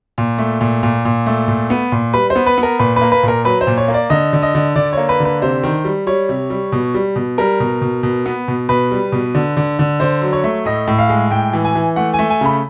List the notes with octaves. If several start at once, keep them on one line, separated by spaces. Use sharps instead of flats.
A#2
A3
A#2
A#2
A#2
A3
A#2
B3
A#2
G3 B4
C5
B3
B4
B3
A#4
A#2 B4
B4
A#3
B4
A#2 A#4
F#3 B4
C5
A#2
C#5
A#3
D5
D3 D#5
D3
D#5
D3
D3 D5
A#3 C#5
B4
D3
B4
C3 C5
D#3
G3
G3 C#5
C3
G3
B2
G3
B2
G3 A#4
B2
B2
B2
B3
B2
B2 B4
G3
B2
D3
D3
D3
D3 C5
F#3
C#5
A3
A2 D#5
A2
F5
G#3
A2 G5
E3
G#5
E3
A3 F#5
G#5
A3
G#5
C#3 B5